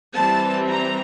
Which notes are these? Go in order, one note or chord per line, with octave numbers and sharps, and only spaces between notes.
E3 G3 C4 A5
A#5